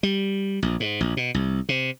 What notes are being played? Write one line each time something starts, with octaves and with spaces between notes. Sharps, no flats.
G3
A#1
G#2
A#1
B2
C2
C3